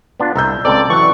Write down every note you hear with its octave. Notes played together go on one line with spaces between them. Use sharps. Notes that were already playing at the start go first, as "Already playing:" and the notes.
B3 D4 F4
C2 A#5 E6 G6
C#2 C4 A4 D5 A#5
E3 F#3 C#6